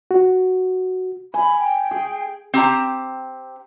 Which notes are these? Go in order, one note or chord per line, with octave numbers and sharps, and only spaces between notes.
F#4
G#5 B5
G5
G#4
C4 G4 A#5